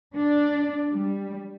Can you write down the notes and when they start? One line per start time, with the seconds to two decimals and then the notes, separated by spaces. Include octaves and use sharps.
0.15 D4
0.92 G3